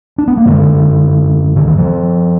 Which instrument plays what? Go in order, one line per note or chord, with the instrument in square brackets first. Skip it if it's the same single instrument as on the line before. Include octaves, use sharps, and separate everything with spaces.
[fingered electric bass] D4
B3
A#3
F#2 D3 G#3
D3
D#3
F3